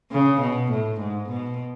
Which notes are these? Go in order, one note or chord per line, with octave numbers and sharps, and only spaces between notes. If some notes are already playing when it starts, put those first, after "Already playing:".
C#3
B2
A2
G#2
B2